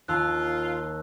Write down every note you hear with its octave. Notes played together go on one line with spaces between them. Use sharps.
D#2 F4 A5 E6 F#6